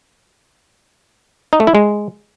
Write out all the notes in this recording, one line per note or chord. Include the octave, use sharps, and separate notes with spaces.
D#4
A3
E4
G#3